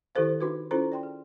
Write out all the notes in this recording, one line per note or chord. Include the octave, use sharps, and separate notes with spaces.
D#3 E4 G4 A4 C5 F5
D4 D#4 F#4 B4
C#4 E4 F4 A4 C5 A#5
D5 G5 C6
G#4